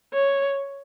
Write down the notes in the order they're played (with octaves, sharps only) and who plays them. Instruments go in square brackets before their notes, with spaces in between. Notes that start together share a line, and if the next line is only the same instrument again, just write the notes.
[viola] C#5